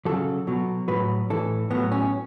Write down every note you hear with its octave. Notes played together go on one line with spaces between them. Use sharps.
C#3 F#3 A4
B2 F#3
A2 F#3 B4
A2 E3 A4
A2 F#3 B3
C#4